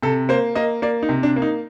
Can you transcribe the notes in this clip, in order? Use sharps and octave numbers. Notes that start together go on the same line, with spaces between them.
C3 A4
A#3 C5
A#3 D#5
A#3 D5
D#4
C3
D4
A#3
D#4